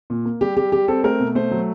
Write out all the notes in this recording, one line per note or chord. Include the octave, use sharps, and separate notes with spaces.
A#2
A#3
G3 G4
G3 G4
G3 G4
C4 A4
A3 A#4
B2
A3 C5
F#3